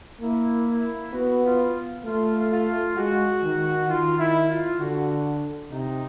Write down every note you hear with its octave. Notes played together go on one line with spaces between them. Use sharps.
A#3 E4
E4
B3 F#4
F4
A3 F4
F4
G#3 F#4
D#3
D#3 F4
E4
F4
D3 F#4
C3 D#4